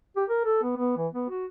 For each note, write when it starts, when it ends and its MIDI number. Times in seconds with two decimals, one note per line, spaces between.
0.17 0.24 67
0.30 0.40 70
0.45 0.63 69
0.63 0.76 59
0.77 0.96 59
0.97 1.07 52
1.13 1.29 59
1.30 1.46 66